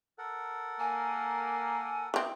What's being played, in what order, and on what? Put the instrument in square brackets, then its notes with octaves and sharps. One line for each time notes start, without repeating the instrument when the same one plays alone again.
[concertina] A4 A#4 F#5
[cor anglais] A#3 [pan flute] G#5
[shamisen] E3 C4 [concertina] D#4 E4 F#4